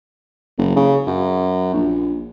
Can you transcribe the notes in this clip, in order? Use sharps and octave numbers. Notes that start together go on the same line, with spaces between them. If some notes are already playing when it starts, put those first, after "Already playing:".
F#1
C#3
F#2
A#1